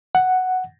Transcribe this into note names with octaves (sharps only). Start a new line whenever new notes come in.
F#5